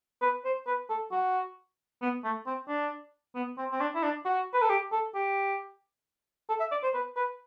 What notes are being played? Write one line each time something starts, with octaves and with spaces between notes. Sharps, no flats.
B4
C5
B4
A4
F#4
B3
A3
C4
D4
B3
C4
C4
D4
E4
D4
F#4
B4
A4
G4
A4
G4
A4
E5
D5
C5
B4
B4